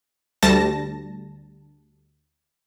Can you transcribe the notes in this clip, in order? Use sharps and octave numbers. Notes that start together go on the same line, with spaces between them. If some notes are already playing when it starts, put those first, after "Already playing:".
D2 G3 A5 A#6